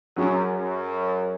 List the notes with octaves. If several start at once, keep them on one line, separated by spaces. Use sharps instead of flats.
F#2 F#3 C#4 G#4
F#2